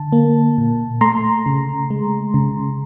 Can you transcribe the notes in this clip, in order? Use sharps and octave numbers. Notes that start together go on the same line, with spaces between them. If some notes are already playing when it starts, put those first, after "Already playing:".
Already playing: D3 A5
A#3
A#2
A3 A#5 C6
C#3
G#3
C#3